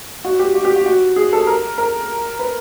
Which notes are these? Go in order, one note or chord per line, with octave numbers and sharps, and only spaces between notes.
F#4
G4
F#4
G4
F#4
F#4
G#4
A4
A#4
A#4
B4